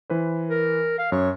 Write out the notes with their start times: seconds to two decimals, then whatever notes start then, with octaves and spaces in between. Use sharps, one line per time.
0.10 E3 B4 C5
0.50 A#4
0.98 F5
1.12 F#2 C#5